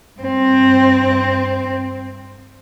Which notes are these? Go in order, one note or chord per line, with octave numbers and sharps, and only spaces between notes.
G2 C4